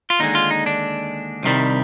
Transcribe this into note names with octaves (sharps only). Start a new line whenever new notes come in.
F4
D#2 D3 G#3 D#4
F4
D#4
D4
C2 C3 D#3 G3